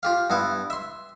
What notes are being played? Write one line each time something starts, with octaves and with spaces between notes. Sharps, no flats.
F4 G4 F5
G2 B3 E4
E5 C6